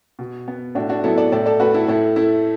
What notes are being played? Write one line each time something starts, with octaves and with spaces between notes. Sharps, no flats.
B2
B3
A2 D4 F#4
D4 F#4
F#3 B3 E4 A4
A4 D5
A2 A4 D5
A4 D5
A3 F#4 B4
E4 A4
A2 E4 A4
A3 E4